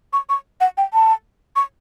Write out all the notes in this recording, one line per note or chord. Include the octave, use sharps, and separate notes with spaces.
C#6
C#6
F#5
G5
A5
C#6